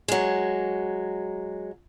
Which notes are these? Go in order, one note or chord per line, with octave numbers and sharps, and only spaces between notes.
F#3 G#3